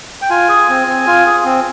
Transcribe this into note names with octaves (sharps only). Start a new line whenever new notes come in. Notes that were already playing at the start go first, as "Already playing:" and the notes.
G5
F4 G#5
G#4
C4
C4
F4
G#4
C4